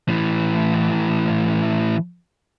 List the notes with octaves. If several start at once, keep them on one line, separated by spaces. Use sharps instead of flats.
A2 E3